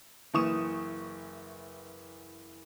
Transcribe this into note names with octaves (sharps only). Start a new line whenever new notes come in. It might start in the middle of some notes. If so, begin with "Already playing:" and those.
F#1 E3 C#6 D#6 E7